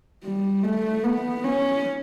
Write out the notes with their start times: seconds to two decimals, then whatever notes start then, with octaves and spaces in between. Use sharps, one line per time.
0.24 G3
0.63 A3
1.04 B3
1.44 C#4